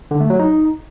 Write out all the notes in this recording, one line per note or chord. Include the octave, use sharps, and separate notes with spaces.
D3
A3
F#3
D#4